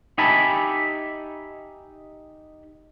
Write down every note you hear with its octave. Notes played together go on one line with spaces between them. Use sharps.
D#4 G4 E5 G#5 A5 B5